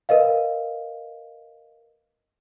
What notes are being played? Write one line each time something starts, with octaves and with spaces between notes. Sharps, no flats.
A#4 B4 D#5 F5